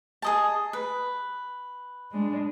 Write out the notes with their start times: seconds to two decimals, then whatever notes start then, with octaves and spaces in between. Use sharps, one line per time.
0.22 G#4 D#5 A5
0.73 B4
2.10 G#3 D4